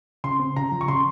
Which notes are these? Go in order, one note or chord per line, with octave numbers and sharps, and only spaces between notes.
C#3 C6
C4
C#3 A#5
F3
C#6
C#3 C6